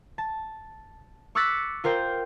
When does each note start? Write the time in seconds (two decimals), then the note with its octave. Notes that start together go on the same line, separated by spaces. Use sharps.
0.18 A5
1.35 C#6 D6 E6 F#6 A6 B6
1.84 F4 A#4 C5 G5